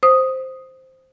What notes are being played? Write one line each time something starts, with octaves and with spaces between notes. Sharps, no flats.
C5 D#6